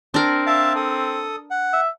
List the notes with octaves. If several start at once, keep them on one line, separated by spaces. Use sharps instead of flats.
C4 D4 A#4
E5 F5 A5
A4 D#6
F#5
E5